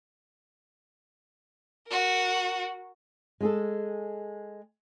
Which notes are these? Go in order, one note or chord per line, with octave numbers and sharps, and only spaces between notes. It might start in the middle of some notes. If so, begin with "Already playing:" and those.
F#4 A#4
G#3 G#4 A4